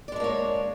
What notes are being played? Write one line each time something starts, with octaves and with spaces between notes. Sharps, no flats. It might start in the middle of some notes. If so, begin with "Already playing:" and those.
G#3 A#3 D4 C#5 D5